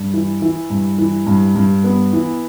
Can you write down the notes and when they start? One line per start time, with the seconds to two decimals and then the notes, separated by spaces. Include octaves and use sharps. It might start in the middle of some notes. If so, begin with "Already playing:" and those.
Already playing: G2
0.14 E3
0.42 E3
0.70 G2
0.98 E3
1.27 G2
1.55 G2
1.84 B3
2.13 E3